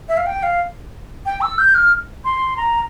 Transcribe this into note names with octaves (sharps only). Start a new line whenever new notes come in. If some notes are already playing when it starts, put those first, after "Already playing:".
E5
F5
G5
F5
G5
E6
G6
F6
C6
A#5